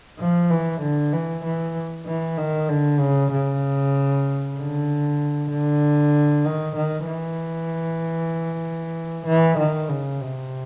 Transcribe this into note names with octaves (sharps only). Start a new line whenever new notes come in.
F3
E3
D3
E3
E3
E3
D#3
D3
C#3
C#3
D3
D3
D#3
D#3
E3
E3
D#3
C#3
C3